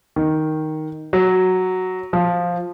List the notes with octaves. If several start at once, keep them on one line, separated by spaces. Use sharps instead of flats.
D#3
F#3
F3